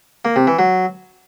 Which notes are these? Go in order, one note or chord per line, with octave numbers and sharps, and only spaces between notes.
A#3
C3
E3
F#3